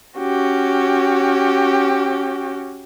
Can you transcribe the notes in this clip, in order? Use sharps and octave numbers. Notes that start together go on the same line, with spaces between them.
C#4 F#4 G4